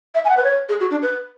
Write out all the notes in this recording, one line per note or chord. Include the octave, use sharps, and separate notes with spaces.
E5
G#5
F#5
B4
C#5
G#4
F#4
D4
B4